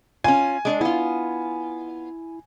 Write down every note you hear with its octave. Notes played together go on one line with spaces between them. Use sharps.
C#4 F4 G#5
G#3 D4 G#4
B3 E4 F4